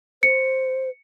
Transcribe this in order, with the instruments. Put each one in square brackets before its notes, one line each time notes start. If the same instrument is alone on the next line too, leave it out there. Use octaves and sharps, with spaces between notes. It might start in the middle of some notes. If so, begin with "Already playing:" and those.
[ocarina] C5 [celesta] C#7